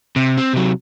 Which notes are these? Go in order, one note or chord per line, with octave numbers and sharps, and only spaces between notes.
C3
C4
C3 F#3